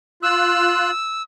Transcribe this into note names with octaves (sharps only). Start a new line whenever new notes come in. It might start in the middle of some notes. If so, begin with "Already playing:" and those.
F4 E6 F#6